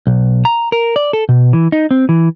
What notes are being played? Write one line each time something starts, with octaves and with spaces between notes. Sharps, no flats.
B1
A#5
A#4
D5
A4
B2
E3
D#4
C4
E3